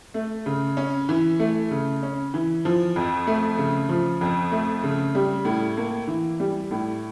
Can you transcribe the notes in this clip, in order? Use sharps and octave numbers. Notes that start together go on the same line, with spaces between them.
A3
C#3
C#4
E3
A3
C#3
C#4
E3
F3
F2
A3
C#3
F3
F2
A3
C#3
G3
A2
A#3
E3
G3
A2